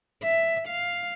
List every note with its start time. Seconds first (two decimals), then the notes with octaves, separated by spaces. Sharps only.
0.23 E5
0.68 F5